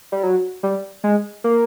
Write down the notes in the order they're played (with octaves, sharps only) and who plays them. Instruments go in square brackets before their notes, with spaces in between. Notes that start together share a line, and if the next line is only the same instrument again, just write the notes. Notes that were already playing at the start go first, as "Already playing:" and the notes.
[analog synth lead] G3
F#3
G3
G#3
A#3